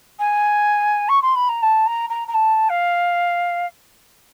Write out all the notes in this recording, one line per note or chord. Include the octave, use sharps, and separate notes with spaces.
G#5
C#6
C6
B5
A#5
A5
A#5
A#5
A#5
A5
F5